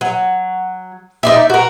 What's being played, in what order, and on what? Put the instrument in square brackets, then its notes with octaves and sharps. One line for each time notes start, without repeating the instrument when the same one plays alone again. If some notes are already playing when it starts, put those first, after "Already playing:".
[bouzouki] F#3
D#4 D5 E5
F#4 A#4